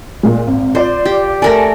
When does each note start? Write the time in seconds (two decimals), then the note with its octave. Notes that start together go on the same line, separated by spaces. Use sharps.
0.23 A#2 G#3
0.47 G#1
0.75 F4 C5 D5
1.05 G4
1.42 A3 A#4 D5 G#5 A#6